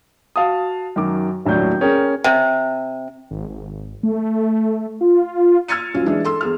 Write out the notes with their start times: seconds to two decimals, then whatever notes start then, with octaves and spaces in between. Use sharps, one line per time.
0.36 F#4 F5 A5 D#6
0.96 F#2 D#3 D6
1.46 D#1 A2 F#3 D4 G6
1.81 C#4 G#4 A#4 G5
2.24 C3
3.31 G#1
3.50 G#1
4.03 A3
5.01 F4
5.68 E6 F6 G#6 A6 C#7 D#7
5.94 D#1 F#3 C#4 F4
6.06 E3 G#3 D4 E4
6.25 A4 C6 E6
6.41 E2 G#4 F6